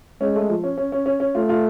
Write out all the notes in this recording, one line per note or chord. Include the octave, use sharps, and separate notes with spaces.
G#3 C#4
A3
F3
C#4
C#4
C#4
C#4
C#4
A3 F4
F4